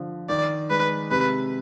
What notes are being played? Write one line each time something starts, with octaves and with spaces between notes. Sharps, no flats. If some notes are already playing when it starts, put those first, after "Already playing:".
Already playing: D3 F3
D#3 D5
G#3 B4
C3 B4